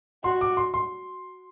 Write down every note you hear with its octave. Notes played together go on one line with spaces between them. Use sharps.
F#4 C6
D6
C6
C6